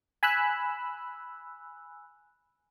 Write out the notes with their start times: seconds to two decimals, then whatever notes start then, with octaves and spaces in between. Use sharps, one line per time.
0.23 G#5 B5 E6 F#6